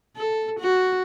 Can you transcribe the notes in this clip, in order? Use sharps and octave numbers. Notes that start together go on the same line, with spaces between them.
A4
F#4